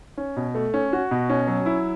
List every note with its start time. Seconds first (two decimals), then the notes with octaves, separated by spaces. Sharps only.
0.18 C#4
0.37 B2
0.55 A3
0.74 C#4
0.93 F#4
1.11 B2
1.30 C#4
1.47 F#3
1.66 E4